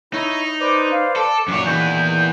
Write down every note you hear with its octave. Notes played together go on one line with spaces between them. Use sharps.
D#4 E4 C#5 E5
B4 C5 D5 D6
F5
A4 D6
F#2 A#2 D#3 C#5
E3 B3 G6